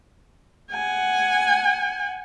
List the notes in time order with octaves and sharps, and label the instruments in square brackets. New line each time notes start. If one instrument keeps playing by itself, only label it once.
[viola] F#5 G#5